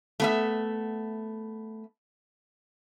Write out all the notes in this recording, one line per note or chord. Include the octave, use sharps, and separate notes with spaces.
A3 B3 E5